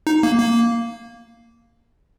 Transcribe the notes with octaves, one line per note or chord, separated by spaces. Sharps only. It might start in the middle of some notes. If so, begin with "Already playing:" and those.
D#4
A#3
A#3